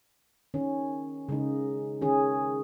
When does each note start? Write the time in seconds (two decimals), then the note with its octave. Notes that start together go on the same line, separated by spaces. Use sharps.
0.54 D#3 C#4
1.29 C#3 G#3 D#4
2.02 D#3 C#4 G#4